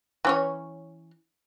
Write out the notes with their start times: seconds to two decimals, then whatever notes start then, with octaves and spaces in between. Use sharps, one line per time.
0.25 E3 C#4 C#5